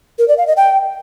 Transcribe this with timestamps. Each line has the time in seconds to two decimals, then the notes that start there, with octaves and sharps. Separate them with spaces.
0.19 A#4
0.28 D5
0.38 F5
0.47 D#5
0.57 G5